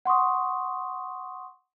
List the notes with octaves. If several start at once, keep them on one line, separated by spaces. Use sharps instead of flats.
F#5 C6 C#6 D#6